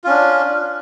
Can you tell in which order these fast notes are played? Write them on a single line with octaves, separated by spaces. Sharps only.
F4 C#4 D4